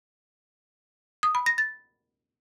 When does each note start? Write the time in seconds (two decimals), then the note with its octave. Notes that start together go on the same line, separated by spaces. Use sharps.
1.23 D#6
1.35 B5
1.46 A#6
1.58 A6